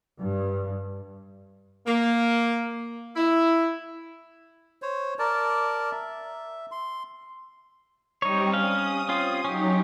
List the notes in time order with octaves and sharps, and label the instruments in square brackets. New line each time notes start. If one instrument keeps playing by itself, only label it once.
[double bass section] G2
[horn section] A#3
E4
[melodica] C5 C#5
A#4 D5 A5
E5
C6
[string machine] G3 C4 [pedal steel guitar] D#4 C#5
[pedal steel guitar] C#4 F5 [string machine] D#6
[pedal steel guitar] C4 C#4 F4
[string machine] F#3 D#4 [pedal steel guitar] C#4 G4